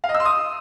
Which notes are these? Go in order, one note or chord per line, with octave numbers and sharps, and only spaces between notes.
F5
D#5
E6
C6
D#6